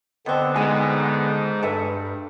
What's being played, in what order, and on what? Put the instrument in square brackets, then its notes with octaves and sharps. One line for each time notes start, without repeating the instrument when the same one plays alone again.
[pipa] B2 C4 [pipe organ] D3 B3
[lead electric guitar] G#2 G#3 [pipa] C3 D#5 G#5
[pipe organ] G2 [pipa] A4 B4 E5